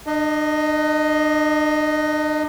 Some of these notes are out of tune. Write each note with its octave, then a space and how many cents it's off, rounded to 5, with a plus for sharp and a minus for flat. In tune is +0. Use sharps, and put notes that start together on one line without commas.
D4 +45 D#5 +0